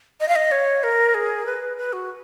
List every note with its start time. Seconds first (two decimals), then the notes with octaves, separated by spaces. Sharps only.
0.20 D#5
0.28 F5
0.35 D#5
0.51 C#5
0.83 A#4
1.14 G#4
1.46 B4
1.77 B4
1.93 F#4